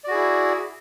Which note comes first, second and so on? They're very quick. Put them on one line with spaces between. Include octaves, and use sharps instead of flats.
D5 F#4 G#4 E4